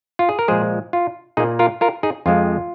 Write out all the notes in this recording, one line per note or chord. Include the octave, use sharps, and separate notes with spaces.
F4
G#4
A#4
A#2 F3 G#3 G#4 C5
F4
A#2 A#3 D#4 G#4
F4 A#4
F4 A#4
D#4 G#4
F2 F3 G#3 C4 F4